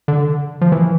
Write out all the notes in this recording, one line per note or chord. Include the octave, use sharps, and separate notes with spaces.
D3
F3
E3